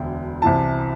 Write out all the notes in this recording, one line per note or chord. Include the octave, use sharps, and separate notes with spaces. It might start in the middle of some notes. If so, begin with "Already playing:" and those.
Already playing: E1 D2 D3 G5
C2 C3 E3 A5